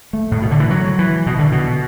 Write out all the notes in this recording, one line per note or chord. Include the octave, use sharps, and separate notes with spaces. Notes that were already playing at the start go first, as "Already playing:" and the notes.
A3
A2
B2
D3
E3
F#3
E3
B2
D3
B2